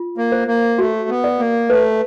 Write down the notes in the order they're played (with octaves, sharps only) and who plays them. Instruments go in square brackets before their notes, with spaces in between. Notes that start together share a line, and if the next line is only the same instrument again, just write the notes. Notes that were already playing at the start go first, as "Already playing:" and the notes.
Already playing: [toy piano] F4
[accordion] A#3
[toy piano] C5
[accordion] A#3
[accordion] A3 [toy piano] F#4
[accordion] B3
[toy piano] D5
[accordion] A#3
[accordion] A3 [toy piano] B4